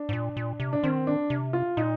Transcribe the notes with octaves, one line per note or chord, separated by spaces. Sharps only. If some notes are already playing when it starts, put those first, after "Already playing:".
Already playing: D4
G#2
A#2
A#2
C3
D4
D#3 C4
D4
C3
F4
A#2 D#4